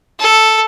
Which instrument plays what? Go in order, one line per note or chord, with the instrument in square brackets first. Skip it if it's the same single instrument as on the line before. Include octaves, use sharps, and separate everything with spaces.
[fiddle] A4